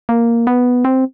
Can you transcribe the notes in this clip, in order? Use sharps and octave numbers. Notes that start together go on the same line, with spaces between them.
A#3
B3
C4